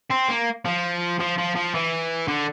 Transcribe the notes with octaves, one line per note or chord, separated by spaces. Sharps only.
C4
A#3
F3
F3
F3
F3
E3
D3